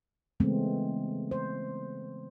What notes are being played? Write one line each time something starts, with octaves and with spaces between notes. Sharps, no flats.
C#3 E3 G#3 A3 B3 C4
C5